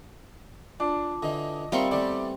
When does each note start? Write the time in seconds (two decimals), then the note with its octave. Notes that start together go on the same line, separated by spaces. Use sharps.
0.80 D4 F4 A5 D6
1.22 D3 E3 D#5
1.72 G3 A#3 C4 D#4 F4 E5 C#6
1.91 E3 A3 B3 D5